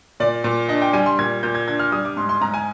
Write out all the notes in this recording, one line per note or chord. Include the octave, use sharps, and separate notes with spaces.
A#2 D5
A#2
D4 D#5
G5
G3 G#5
C6
A#2 G#6
A#2 G6
G#6
D4 G#6
F6
G3 D#6
D6
G#2 C6
C6
G#2 A#5
G#5